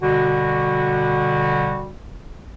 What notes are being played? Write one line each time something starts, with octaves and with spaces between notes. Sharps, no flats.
B2 D3 G3 F#4